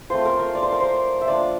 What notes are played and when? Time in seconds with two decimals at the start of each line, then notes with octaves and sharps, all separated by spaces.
0.10 A3 C4 F4 C5
0.25 A#4
0.39 A#4
0.55 D5
0.63 C5
0.72 A#4
0.80 C5
1.21 E5
1.27 F3 A#3 D4 F4 D5